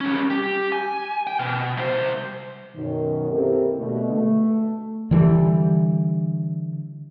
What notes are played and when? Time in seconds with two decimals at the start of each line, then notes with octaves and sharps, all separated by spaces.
0.01 G3 C#4
0.30 G4
0.72 G#5
1.27 G5
1.39 B2
1.77 C2 C5
2.75 F#2 B2 D#3
3.30 A#3 C4 E4 G4 A4 A#4
3.77 B2 D3 A3
4.12 A3
5.11 D3 E3 G3